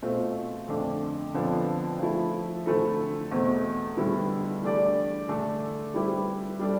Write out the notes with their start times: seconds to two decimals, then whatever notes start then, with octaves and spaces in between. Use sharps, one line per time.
0.02 B2 A3 C4 F4
0.68 F2 D3 A3 D4
1.34 F2 D3 F3 B3 F4
1.99 F3 A3 E4
2.66 D3 A3 C4 E4 A4
3.31 E2 B2 A3 C4
3.97 D3 G3 B3 E4 A4
4.62 E3 A3 D4 G4 D5
5.28 D3 A3 D4 A4
5.94 G3 C4 E4 G4 B4
6.59 G3 D4 A4 D5